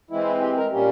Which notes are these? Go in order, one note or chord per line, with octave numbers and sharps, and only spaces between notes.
E3 G#3 C4 E4
G4
A#4
A#2 G3 A#3 C#4 G4